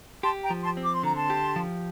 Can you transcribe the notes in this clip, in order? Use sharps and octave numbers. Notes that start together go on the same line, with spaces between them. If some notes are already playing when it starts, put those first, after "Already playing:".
G4 A5 C6
G5 A#5
F3
A5 C6
C4
D6
C6
D3 A#5
A5 C6
G4
F3